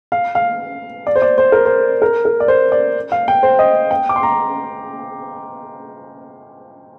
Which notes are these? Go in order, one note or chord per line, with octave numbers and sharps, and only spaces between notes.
F5
F5
D5
C5
D5
C5
A#4
C5
A#4
A#4
D5
C5
D5
F5
G5
C5
D#5
G5
D6
C6
A#5